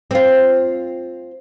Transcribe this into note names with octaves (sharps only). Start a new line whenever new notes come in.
C4 F4